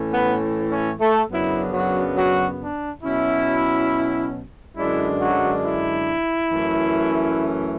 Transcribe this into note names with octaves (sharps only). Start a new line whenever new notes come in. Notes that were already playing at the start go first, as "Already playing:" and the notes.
Already playing: A2 E3 A3 C#4
B3 B4
C#4 C#5
A3 A4
F#2 C#3 F#3 B3 D4 E4
F#3 F#4
F#3 F#4
D4
B2 F#3 C#4 E4
F#2 D3 G#3 D4 E4
F#3 F#4
E4
F#2 E3 A3 C#4